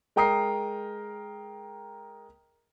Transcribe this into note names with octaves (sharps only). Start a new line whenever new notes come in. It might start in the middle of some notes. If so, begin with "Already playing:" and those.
G#3 A#4 G5 A#5 D#6 C7